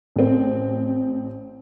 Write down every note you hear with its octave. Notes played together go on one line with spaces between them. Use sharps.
A1 C4